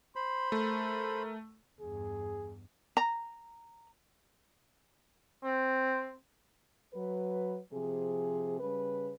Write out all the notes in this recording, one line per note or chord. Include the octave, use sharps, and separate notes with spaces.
C5 B5 C6
A3 A#4
E2 G2 G#4
A#5
C4
F#3 B4
C3 F3 G#4
C#3 G3 B4